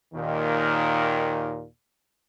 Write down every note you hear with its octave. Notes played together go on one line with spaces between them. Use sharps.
D#2 A#2 D#3